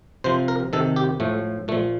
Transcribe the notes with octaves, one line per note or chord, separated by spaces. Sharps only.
C3 F3 C5
A#4
C3 D#3 A4
G4
A2 F3 A3
A#2 F3 A3